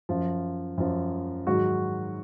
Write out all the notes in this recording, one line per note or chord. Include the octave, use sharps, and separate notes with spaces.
F#2 F3
F#2 F3
G#2 D#3 F#3 F#4